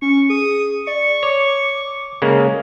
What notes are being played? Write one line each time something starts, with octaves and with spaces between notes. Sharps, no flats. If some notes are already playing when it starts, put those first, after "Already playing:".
C#4 C#6
G#4 D#6
D5 C#6
C#5 D6
C#3 G#3 A#3